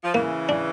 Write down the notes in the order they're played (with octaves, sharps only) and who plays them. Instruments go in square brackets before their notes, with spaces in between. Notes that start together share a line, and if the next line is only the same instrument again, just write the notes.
[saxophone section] F3
[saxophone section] C#3 E3 [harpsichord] A#3
[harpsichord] D4